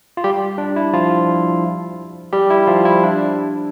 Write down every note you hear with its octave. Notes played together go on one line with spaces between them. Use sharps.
F4
G3 G4
D4
E4
F3 F4
G3 G4
E4
F3 F4
E4
D4